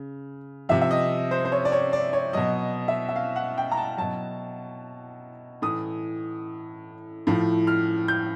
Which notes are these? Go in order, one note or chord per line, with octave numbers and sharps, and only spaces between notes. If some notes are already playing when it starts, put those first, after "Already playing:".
Already playing: C#3
C3 F3 E5
E5
D#5
C5
C5
C#5
D5
C#5
D5
C#5
B2 F#3 D#5
E5
E5
F5
F#5
G5
A#5
A5
B2 F#3 A5
A2 E3 D#6
A2 F3
F6
G6